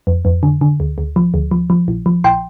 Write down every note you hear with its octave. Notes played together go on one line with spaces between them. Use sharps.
F2
F2
D3
D3
D2
D2
F3
D2
F3
F3
A#1
F3
A#1 G5 C6